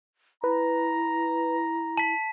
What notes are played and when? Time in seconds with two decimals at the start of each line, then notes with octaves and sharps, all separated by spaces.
0.44 E4 B4 A#5
1.97 A5 B6